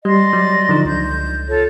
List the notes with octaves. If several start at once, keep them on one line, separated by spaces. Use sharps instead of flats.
G3 D5 D#5 C6
F#3
D3 F3 D#4
C#2 G6
F4 A4 C#5